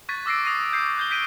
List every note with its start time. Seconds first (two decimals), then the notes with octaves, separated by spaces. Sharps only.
0.09 C#6 F#6 G#6 A6 B6 D#7
0.26 D6 E6 A#6 C7 D7
0.45 D#6 A#6 C7 D#7
0.73 G6 C7
0.97 F#6 G6 G7
1.10 G6 B6 D7 D#7 G7